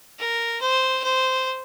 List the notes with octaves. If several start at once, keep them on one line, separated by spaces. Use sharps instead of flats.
A#4
C5
C5